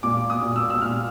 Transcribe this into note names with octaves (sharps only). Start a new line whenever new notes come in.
A#2 D6
D#6
A#2
E6
E6
A#2 F6